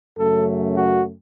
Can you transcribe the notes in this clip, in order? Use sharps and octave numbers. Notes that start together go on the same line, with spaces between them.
F#2 C#3 F#3 A3 A4
F#4